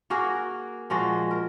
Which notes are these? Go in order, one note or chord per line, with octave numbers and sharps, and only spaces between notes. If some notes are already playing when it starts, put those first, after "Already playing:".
A#3 F#4 G#4 A#4
A#2 F3 G#3 F#4
A#4